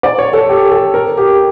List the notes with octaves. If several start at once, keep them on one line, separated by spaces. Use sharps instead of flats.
D5
C#5
A4
G4
A4
A#4
G4